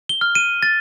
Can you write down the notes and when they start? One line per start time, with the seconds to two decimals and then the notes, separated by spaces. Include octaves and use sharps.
0.09 G7
0.21 F6
0.35 D#7
0.63 A6